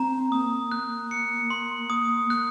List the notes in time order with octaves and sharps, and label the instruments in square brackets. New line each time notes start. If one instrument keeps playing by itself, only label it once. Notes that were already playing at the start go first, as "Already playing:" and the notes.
Already playing: [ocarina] C4 [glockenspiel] A#5
[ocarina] A#3 [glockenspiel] D#6
[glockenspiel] F#6
C#7
C6
D#6
[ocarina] A#3 [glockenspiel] F#6